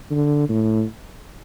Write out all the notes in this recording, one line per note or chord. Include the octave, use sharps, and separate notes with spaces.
D3
A2